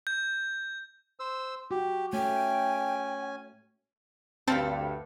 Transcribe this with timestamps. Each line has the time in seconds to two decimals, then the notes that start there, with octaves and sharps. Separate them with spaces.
0.07 G6
1.19 C5 E6
1.71 F#4 G4
2.13 A3 C#4 G5 G#5
4.48 D2 G2 C4 A4 F5 A5 B5 A6